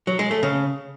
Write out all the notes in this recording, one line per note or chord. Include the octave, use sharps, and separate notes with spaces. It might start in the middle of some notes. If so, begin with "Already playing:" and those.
F#3
G#3
A3
C#3